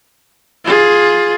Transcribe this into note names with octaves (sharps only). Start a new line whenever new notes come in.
F4 G#4